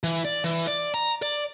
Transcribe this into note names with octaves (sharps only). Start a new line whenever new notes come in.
E3
D5
E3
D5
A#5
D5